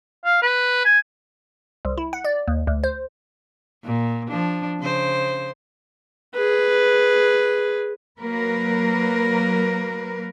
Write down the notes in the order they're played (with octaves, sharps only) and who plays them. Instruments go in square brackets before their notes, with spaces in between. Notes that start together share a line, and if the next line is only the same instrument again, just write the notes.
[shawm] F5
B4
G#5
[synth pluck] C2
E4
F#5
D5
D#2
D2
C5
[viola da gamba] A#2
F3 D4
C#3 C5
[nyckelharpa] G#4 B4
[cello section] F#3 A#3 A#4 B4